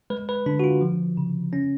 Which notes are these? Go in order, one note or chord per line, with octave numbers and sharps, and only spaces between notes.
G#3 B4
B4
D3 D4
F#4
F4
F3
C#3
C#4